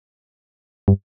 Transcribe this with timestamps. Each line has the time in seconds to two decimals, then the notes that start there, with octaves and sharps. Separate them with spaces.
0.88 G2